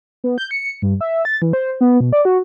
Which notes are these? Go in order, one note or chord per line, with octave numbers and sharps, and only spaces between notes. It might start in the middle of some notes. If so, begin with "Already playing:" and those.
B3
G6
C#7
G2
E5
A6
E3
C5
B3
B2
D5
F#4